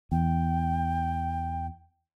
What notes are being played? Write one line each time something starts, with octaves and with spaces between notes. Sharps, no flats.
E2 G5